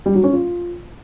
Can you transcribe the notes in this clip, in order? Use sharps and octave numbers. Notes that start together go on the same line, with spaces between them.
G3
F#3
C#4
F4